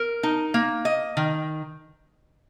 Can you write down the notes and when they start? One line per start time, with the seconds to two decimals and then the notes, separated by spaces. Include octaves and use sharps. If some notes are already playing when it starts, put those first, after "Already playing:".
Already playing: A#4
0.23 D#4
0.54 A#3
0.85 D#5
1.17 D#3